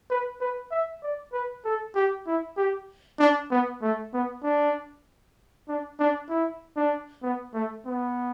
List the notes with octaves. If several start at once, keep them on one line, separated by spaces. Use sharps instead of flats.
B4
B4
E5
D5
B4
A4
G4
E4
G4
D4
B3
A3
B3
D4
D4
D4
E4
D4
B3
A3
B3